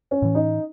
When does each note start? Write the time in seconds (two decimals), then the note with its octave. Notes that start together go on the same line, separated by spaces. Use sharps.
0.11 C#4
0.22 A2 E3
0.35 D#4